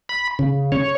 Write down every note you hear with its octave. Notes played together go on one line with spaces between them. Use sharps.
B5
C#3
C#5